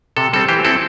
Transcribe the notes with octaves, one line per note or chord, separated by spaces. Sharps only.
C3 A4
G3 C4 A4
E3 G4 C5
C4 E4 A4